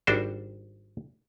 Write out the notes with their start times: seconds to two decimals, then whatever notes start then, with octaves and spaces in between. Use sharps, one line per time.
0.07 G#1 G3 D4 F#4 C5